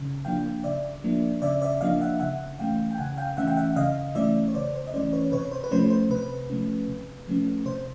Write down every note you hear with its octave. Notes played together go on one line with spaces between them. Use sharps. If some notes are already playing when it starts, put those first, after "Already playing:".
Already playing: C#3
F3 A#3 D4 F5 G5
C#3 D5 E5
F3 A#3 D4
C#3 D5 E5
D5 E5
F3 A#3 D4 D#5 F5
E5 F#5
C#3 E5 F#5
E3 A3 C#4 F5 G5
G5
C#3 F#5 G#5
F5 G5
E3 A3 C#4 E5 F#5
G5
E5 F#5
C#3 D#5 F5
E3 A3 C#4 D5 E5
C#5
C#3 C5 D5
C5
D#5
E3 A3 C#4 C5 D5
B4 C#5
C3 B4 C#5
C5
B4
F3 A3 C#4 C5
C5
C3 B4
F3 A3 C#4
C3
F3 A3 C#4
C3 C5